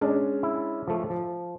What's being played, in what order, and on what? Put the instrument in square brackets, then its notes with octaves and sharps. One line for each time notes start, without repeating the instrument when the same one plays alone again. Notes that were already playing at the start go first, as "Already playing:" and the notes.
[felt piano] G#3 C#4 D4
[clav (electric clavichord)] E4
F3 A3
F3